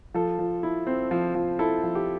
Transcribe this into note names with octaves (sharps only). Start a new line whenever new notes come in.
F3 A4
F3
E4
C4
F3
F3
E4 A4
F3
G4